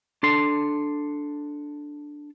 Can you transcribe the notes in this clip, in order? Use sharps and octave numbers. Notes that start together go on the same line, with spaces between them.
D4 A4 C6